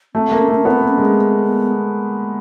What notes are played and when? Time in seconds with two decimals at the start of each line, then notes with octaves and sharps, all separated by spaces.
0.14 A3 C4
0.31 A#3
0.40 C#4
0.48 A3
0.55 C#4
0.65 B3 C4
0.81 A#3
0.90 C#4
0.98 G#3
1.15 C4
1.40 B3